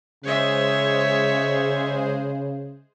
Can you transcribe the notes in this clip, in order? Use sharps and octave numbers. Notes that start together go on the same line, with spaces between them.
C#3 G#3 G#4 C5 C#5 E5